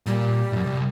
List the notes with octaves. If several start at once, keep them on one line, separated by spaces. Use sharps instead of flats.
A#2 G3
F#2 A2
C2